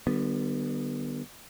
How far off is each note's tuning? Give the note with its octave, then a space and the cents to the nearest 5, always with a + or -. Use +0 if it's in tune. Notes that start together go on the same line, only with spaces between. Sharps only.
D3 +40 G3 -20 B3 +0